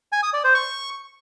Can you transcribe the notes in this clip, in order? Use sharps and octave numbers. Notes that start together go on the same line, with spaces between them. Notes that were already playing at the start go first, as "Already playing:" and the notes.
G#5
D#6
D5
C5
C#6